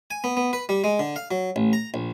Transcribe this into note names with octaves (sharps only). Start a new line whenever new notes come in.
G#5
B3
B3
B4
G3
G#3
D3
F5
F#3
A1
A#5
A#1